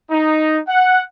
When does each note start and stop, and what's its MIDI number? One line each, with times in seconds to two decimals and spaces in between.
0.10 0.58 63
0.68 1.02 78